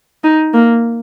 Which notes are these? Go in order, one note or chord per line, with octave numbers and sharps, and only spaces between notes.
D#4
A#3